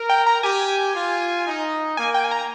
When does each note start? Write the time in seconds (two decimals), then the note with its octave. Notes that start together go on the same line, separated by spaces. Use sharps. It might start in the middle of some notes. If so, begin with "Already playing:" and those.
Already playing: A#4
0.09 G5
0.27 A#5
0.43 G4 G#5
0.94 F4
1.46 D#4
1.97 A#3 G#5
2.14 G5
2.24 G#5
2.31 A#5